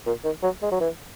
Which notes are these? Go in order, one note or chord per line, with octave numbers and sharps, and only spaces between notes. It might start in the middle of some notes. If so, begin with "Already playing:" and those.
A#2
D#3
F#3
G#3
F#3
E3